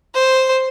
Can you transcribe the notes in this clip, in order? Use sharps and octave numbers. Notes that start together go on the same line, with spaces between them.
C5